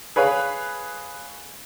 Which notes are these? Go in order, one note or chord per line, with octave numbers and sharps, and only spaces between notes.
G#4 B4 C#5 F5